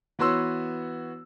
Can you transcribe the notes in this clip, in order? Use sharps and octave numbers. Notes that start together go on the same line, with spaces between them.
E3 B3 F#4 C#5 C6 E6